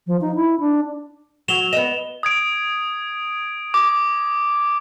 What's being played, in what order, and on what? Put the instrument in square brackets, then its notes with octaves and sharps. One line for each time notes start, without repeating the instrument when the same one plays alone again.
[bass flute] F3
D#4
E4
D4
[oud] F#3 [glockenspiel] E7 F7 G7
[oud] B3 D#5 [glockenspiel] E7
[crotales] D#6 G#6 D7
D6